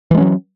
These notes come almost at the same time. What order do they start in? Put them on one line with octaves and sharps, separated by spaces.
E3 G#3 C#4 F#3